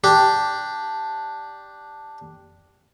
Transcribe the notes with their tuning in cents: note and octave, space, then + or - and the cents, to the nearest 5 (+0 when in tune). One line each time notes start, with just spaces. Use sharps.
D4 +0 G4 +0